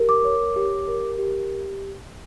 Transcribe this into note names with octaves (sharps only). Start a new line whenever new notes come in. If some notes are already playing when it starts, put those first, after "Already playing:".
Already playing: G4 A#4
D6
C#5
G4
A#4
G4